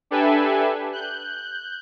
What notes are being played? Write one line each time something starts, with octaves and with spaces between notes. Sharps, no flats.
D4 G4 A4 B4 E5 G#5
F#6 G6